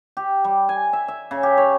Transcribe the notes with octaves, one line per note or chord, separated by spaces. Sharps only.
G4
G3
G#5
E5
E5
C#3
G4
C#5